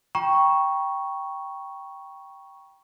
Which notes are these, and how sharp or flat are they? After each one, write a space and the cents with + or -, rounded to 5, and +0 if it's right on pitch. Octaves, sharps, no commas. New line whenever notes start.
G5 +0 A#5 +45 C#6 +0